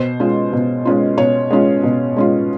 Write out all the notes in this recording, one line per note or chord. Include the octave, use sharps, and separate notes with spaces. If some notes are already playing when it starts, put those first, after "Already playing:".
Already playing: B2 C5
G#3 C#4 F4
B2
G#3 C#4 F4
B2 C#5
G#3 C#4 F4
B2
G#3 C#4 F4